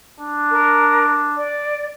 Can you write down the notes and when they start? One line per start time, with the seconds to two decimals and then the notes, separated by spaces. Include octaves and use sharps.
0.20 D4
0.51 A#4
1.37 D5